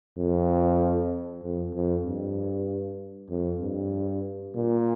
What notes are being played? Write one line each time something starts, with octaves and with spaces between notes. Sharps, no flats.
F2
F2
F2
G2
F2
G2
A#2